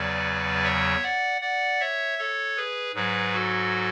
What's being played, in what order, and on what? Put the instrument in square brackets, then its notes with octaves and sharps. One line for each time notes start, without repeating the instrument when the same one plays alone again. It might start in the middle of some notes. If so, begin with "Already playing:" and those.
Already playing: [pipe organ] E2 C#3 F#3 B4 D5
C#5 E5
D5 F#5
D5 F#5
C#5 E5
A4 C#5
G#4 B4
G#2 F#3 G#4 B4
F#4 A4